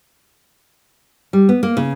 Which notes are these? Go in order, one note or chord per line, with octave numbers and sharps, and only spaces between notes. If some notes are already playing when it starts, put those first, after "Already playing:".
G3
B3
A#3
C#3